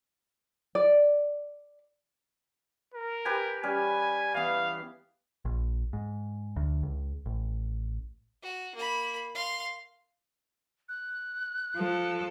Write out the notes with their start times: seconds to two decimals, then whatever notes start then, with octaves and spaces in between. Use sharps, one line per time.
0.75 D5
2.94 A#4
3.25 G4 B4 G#5
3.63 G3 C#4 G#5
4.34 E3 B3 F5
5.45 A#1
5.93 G#2
6.56 D2
6.83 C#2
7.26 A1
8.43 F#4
8.75 A#3 B5
9.35 F5 C6
10.89 F#6
11.76 F3 A4